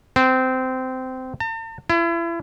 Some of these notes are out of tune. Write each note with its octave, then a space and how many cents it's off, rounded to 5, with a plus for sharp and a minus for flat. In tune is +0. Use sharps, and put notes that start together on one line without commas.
C4 -20
A5 +45
E4 +35